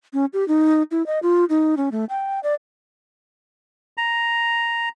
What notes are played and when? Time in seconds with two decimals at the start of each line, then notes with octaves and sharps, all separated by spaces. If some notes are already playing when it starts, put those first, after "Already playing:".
0.13 C#4
0.33 G4
0.48 D#4
0.91 E4
1.06 D#5
1.23 F4
1.49 D#4
1.77 C#4
1.92 A3
2.09 G5
2.43 D5
3.98 A#5